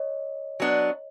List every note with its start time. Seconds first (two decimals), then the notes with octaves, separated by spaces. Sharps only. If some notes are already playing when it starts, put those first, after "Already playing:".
Already playing: C#5 D#5
0.60 F#3 B3 D4